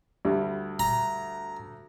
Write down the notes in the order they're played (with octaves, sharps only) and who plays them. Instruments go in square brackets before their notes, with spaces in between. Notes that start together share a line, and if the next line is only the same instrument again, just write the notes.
[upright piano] D2 G3
[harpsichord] A#5